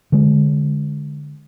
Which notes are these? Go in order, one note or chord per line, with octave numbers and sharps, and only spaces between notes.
D3 G#3